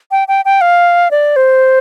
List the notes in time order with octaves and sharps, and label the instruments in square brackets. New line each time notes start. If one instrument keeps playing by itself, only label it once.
[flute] G5
G5
G5
F5
D5
C5